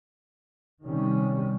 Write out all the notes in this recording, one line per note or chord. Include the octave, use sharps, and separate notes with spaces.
C3 D#3 G3 C#4